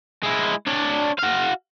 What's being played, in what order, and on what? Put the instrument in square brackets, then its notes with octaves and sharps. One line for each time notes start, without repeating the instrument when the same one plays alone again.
[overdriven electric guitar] G#3 E4
D4 C#5
F#4 F5